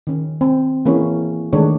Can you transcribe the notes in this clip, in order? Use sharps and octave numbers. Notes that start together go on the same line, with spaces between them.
D#3 C#4
C4
E3 A#3 C#4 G#4 C#5
D#3 G#3 A3 D4 A4 C#5